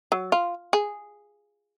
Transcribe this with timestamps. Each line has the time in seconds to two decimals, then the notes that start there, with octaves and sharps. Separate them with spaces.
0.12 F#3
0.32 F4
0.73 G#4